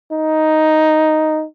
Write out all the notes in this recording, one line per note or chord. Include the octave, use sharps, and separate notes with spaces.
D#4